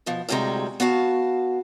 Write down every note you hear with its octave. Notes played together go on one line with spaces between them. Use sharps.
B2 F3
D2 A2 C3 G3 G#3 A#5
B3 F#4 F5 A5